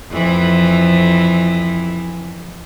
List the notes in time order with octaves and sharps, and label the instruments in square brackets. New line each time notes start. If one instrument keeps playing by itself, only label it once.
[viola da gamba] F2 E3